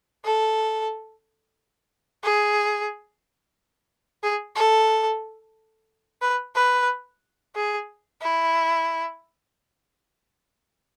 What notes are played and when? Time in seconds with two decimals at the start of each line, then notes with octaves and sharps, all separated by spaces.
0.24 A4
2.23 G#4
4.23 G#4
4.56 A4
6.22 B4
6.55 B4
7.55 G#4
8.22 E4